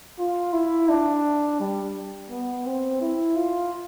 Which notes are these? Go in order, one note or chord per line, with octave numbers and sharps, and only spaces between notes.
F4
E4
D4
G3
B3
C4
E4
F4